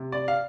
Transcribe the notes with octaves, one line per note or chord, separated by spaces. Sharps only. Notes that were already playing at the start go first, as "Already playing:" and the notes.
Already playing: C3
D5
F5